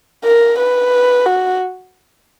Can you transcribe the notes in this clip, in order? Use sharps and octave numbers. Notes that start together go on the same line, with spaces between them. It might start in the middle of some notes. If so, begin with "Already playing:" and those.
A#4
B4
F#4